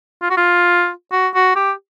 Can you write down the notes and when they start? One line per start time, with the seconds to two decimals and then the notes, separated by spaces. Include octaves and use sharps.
0.22 F4
0.30 F#4
0.37 F4
1.12 F#4
1.35 F#4
1.56 G4